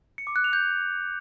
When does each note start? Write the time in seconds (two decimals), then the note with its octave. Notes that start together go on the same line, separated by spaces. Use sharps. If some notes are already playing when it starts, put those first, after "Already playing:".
0.18 C#7
0.27 D6
0.36 F#6
0.44 F7
0.53 G6